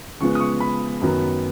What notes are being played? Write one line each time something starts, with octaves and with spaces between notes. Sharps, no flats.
C#3 F3 G#3 B3 C#6
D#6
C#6
B5
F#2 D#3 F#3 B3